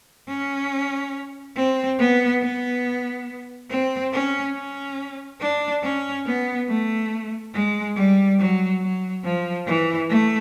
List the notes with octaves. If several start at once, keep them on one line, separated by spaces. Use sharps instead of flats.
C#4
C4
B3
B3
C4
C#4
C#4
D4
C#4
B3
A3
G#3
G3
F#3
F#3
F3
E3
A3